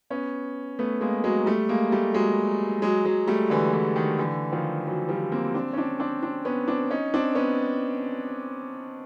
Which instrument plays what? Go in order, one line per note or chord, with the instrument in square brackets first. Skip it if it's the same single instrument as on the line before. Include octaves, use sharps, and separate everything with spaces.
[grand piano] B3 C#4
A3 B3
G#3 A#3
F#3 G#3
G3 A3
G#3 A#3
G3 A3
F#3 G#3
F#3 G#3
F#3 G#3
G3 A3
D3 E3
D3 E3
D#3
D3 E3
D#3 F3
E3 F#3
F3 G3
A#3 C4
C4 D4
C#4
C4 D4
C4 D4
C4 D4
B3 C#4
C4 D4
C#4 D#4
C4 D4
B3 C#4